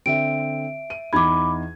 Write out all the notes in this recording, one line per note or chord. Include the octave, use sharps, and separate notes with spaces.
D3 C4 E5 D7
D#7
E2 D#4 B5 D6 G#6